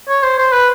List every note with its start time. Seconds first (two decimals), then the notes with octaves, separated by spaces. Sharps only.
0.09 C#5
0.23 C5
0.38 C5
0.52 B4